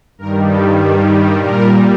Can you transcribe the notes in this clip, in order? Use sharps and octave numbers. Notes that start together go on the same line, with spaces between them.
G2 D#3 G3 A#4
A4
G4
A#2 G3 A#4